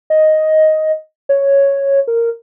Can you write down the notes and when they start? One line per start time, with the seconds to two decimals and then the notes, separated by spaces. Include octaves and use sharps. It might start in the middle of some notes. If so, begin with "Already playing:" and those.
0.10 D#5
1.29 C#5
2.07 A#4